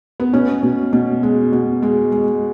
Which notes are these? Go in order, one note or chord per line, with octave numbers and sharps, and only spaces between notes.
B3
B2 C#4
B2
B2
G#3
B2
G#3
G#3